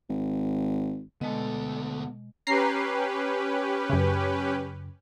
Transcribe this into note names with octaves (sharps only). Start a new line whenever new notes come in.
G#1
D2 B2 G#3 B3 A4 D#5
C#4 G4 B4 A#5 C7
F#2 C#3